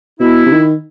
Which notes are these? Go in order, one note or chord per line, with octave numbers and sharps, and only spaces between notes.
B2 E4
C3
D#3